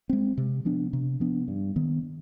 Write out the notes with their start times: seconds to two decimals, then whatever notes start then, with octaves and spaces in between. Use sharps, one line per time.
0.09 G#3 C4
0.38 C3
0.65 F3 B3 D4
0.93 C3
1.20 F3 B3 D4
1.48 G2
1.76 D#3 B3